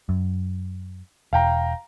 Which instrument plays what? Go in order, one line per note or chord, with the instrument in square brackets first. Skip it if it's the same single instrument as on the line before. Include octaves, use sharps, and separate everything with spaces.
[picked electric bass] F#2
[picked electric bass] E1 [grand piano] F5 G5 A#5